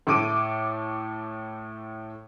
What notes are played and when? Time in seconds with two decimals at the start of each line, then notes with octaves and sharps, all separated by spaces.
0.07 A2 A3 D6 D7 D#7